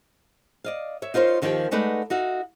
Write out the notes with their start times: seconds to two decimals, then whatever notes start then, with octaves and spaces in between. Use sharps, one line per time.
0.64 D5 D#5 F5
1.02 C#5 E5
1.14 D#4 F4 A#4 C5 C#5
1.42 D#2 D#3 F3 G4 C5 G5
1.71 G#3 A3 D#4 B4 D5 F#5
2.10 D#4 F#4 E5 F5